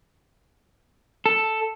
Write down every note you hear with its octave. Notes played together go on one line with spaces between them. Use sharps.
A4